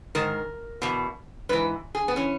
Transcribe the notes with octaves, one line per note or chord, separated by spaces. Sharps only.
G#2 D#3 A#4
E2 B2
G#2 E3 B4
G#4
B3
E3 C#4